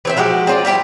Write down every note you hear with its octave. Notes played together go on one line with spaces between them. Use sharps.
E3 C4 E5
F3 G#3 F#4 G4
C4 D4 F4 D5
G3 E4 F4 G4